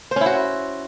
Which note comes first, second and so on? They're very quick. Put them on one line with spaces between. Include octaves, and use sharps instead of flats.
C5 C#4 E4 F#4